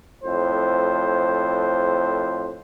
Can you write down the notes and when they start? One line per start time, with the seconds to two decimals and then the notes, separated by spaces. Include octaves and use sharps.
0.23 F2 A2 C5